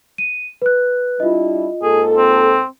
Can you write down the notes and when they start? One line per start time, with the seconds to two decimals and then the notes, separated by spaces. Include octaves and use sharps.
0.18 D#7
0.62 B4 F#6
1.20 G3 D4 E4 F4 D#5
1.82 G#2 A#3 G#4 A4
2.17 C4